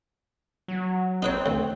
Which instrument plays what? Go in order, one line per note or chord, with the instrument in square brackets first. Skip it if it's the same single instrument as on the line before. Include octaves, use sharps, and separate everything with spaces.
[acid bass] F#3
[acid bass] C4 [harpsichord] D#4 B4 C#5
[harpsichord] D2